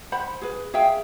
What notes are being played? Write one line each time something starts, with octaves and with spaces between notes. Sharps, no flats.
C5 F#5 B5
G#4 B4
G#4 E5 F5 G5